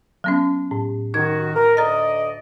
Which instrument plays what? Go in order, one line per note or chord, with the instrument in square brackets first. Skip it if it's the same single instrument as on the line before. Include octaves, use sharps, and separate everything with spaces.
[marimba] F#3 B3 C#4
A2
[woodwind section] D#3 F#4 [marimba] D#4 G#6
[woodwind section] A#4
[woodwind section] D2 D5 D#5 [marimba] A#5 A6